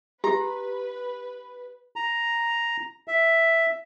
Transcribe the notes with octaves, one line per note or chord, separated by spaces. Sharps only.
G4 B4 A#5
A#5
E5